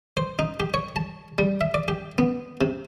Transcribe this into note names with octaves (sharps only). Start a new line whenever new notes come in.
C5
D#4
G4
C#5
A5
G3
E5
D5
G4
B3
C3